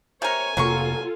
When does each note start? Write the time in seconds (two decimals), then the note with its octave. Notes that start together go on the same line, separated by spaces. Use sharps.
0.22 C3 A#4 C#5 G#5
0.57 F1 C3 F#3 A#3 F4 A4 A#4 C#6